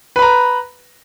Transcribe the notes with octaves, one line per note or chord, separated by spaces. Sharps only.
B4 A#5 B5